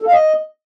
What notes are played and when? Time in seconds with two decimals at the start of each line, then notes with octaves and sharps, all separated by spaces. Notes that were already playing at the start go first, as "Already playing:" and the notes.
0.02 A4
0.07 F5
0.13 D#5